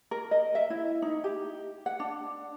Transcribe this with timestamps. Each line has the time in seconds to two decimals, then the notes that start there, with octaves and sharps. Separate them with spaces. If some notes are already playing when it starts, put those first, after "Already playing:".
0.11 A#4
0.31 D#5
0.55 E5
0.70 E4
1.02 D#4
1.24 G4
1.86 F#5
2.00 D4